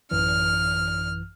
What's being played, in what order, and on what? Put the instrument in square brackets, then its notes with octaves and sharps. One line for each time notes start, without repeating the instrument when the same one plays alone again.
[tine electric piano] A1 F#2 E3 [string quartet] F6